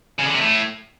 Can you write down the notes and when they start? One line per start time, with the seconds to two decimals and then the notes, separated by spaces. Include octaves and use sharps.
0.19 C#3
0.26 D3
0.33 C3
0.41 A2